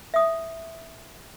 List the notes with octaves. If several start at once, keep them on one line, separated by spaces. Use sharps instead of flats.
E5 D#6